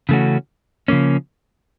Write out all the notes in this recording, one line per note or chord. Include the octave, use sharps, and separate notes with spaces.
C#3 E3 A3 C#4 F#4
C#3 F3 A#3 C#4